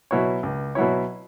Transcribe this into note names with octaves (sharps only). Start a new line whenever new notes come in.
B2 F#3 E4 C#5
C#2
B2 F#3 E4 C#5